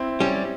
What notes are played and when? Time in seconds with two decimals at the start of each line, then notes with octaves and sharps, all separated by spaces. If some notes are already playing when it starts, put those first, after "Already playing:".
Already playing: C4 E4
0.20 G3 C#4